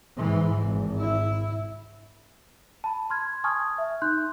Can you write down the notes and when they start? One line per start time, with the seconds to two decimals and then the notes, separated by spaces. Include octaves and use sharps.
0.18 G#2 E3
0.63 G#1
0.99 E4
2.84 A5 B5
3.10 C6 F6 G#6
3.44 G#5 A5 C#6 D#6 F6 G#6
3.78 E5
4.02 D#4 C6 F#6 G6